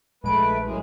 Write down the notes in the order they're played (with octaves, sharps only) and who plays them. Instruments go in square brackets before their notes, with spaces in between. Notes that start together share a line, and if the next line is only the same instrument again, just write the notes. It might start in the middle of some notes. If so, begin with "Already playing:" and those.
[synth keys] A#1 G#3 D7 [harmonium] A3 B4
[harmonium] F#2 A2 G#3